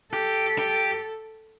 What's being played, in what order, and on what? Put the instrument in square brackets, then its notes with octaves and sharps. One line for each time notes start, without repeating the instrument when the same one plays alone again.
[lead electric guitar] G4 [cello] A4
[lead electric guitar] G4